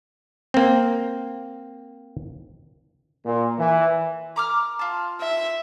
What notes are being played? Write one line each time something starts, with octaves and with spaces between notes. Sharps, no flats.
A#3 C4
A#2
E3
A#5 D6 F6
F4 A5
E5